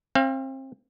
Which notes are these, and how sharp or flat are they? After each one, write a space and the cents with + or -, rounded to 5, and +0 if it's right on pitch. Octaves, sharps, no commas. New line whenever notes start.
C4 +30 F5 -20